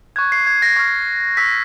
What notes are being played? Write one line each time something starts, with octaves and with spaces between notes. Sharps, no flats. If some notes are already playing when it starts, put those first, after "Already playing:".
C#6 F#6 G#6
C7
G#6
A#6
C#6 F6
C#6 E6 G6 B6